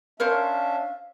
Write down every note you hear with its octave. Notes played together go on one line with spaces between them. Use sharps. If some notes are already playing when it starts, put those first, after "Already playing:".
C#4 D4 A#4 C5 C#5 E5 F5